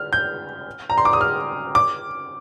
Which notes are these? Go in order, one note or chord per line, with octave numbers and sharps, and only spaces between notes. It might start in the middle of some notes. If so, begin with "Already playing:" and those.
Already playing: F6
G6
A#5
C6
D6
D#6
F6
D6